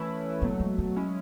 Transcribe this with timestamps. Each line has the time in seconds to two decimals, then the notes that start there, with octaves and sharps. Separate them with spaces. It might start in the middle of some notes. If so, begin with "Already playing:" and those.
Already playing: E3 A3 C#4 E4 B4
0.42 B2 F#3 A3 B3
0.60 G#3
0.78 F#3
0.96 G#3 C#4 E4